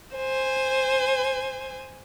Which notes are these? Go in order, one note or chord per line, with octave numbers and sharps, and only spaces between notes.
C5 G#5